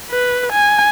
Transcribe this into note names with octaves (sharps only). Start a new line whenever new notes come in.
B4
G#5